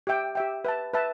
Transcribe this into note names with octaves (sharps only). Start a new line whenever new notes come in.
G4 E5 G5
G4 E5 G5
B4 E5 A5
B4 E5 A5